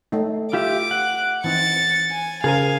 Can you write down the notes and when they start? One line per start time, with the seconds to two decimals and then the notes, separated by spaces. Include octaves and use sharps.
0.12 A3 D#4
0.53 F4 G4 E5 D6
0.91 F#5
1.44 E3 C4 D#4 A6 C#7
2.10 G#5
2.44 C#3 G#4 A#4 C5 F5 G#5